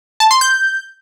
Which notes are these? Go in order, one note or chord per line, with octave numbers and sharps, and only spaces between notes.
A5
C6
G6